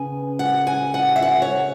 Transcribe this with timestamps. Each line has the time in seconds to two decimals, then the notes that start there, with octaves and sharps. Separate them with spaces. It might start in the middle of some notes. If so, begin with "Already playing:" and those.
Already playing: C#3 B3 G#5
0.39 F#5
0.67 G#5
0.94 F#5
1.16 E5
1.22 F#5
1.42 C#5